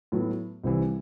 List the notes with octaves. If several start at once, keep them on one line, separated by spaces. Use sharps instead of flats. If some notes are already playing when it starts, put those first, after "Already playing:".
A2 F#3 B3
C2 C3 E3